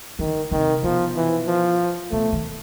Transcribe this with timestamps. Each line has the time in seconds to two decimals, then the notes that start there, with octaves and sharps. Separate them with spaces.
0.19 D3 D#3
0.51 C3 D#3
0.84 B2 F3
1.16 E3
1.47 F3
2.11 B2 A3
2.32 D#3